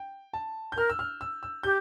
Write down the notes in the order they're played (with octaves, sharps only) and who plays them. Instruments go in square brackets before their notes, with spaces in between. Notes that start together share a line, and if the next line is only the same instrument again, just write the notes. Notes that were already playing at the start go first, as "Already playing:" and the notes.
Already playing: [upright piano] G5
A5
G6
[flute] A#4 [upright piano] F6
[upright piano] E6
F6
E6
E6
[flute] G4 [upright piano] G6